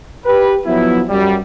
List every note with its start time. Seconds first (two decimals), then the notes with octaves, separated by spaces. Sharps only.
0.25 G4 B4
0.66 F3 F#3 B3 E4
1.09 F#2 G3